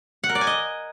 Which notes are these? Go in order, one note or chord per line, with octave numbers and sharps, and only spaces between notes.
F#5
A#4
D5
G#5
D#5